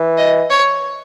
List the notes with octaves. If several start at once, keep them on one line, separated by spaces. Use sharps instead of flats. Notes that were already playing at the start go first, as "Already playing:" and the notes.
Already playing: E3
D#5
C#5